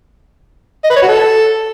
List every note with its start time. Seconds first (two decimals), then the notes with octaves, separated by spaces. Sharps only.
0.84 D#5
0.90 B4
0.96 C#5
1.02 F#4
1.08 A4